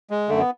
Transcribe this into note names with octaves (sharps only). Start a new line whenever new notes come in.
G#3
F#2 D3 A3
B3